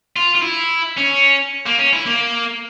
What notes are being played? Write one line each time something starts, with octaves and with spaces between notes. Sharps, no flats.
F4
F4
E4
C#4
A#3
C#4
E4
A#3